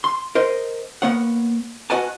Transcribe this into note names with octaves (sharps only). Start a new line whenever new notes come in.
C6
A#4 C5 D#5
A#3 B3 C#5 F#5
F#4 B4 D#5 F#5 G#5 A5